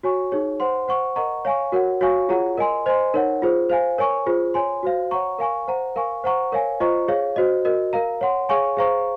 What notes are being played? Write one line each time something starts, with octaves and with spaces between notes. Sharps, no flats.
F#4 C#5 G#5 C#6
D#4 G#4 C#5
C5 F#5 C6
C5 F#5 C#6
A#4 D#5 F#5 A#5 C#6
C#5 F5 G#5 C#6
F#4 A#4 C#5 F#5
F#4 C#5 F5 G#5 C#6
F4 G#4 C#5 F#5 A#5
A#4 D#5 G#5 C6
C5 D#5 G#5 C6
D#4 A#4 C#5 F#5
F4 G#4 C5
C5 F5 G#5
A#4 C#5 G#5 C#6
F4 G#4 C5
C#5 G#5 C6
F#4 C5 F5
C#5 F#5 A#5 C#6
A#4 F5 G#5 C#6
C5 F#5 A#5
A#4 F5 G#5 C#6
C5 F#5 A#5 C#6
A#4 C#5 F5 G#5
F4 C5 D#5 A#5 C#6
G#4 C#5 F5
F#4 C5 D#5
F#4 A#4 D#5
A#4 F5 A#5
C#5 F#5 C6
G#4 C#5 F5 G#5 C#6
G#4 C5 F5 A#5 C#6